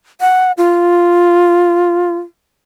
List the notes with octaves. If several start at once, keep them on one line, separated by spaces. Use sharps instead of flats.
F#5
F4